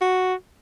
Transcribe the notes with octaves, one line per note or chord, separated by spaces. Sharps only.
F#4